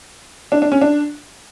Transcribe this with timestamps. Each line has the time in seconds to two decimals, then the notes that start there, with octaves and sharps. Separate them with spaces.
0.52 D4
0.62 D4
0.72 C#4
0.81 D4